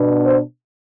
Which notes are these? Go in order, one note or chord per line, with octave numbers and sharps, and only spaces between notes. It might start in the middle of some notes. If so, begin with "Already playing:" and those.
Already playing: B2 B3 D4
C5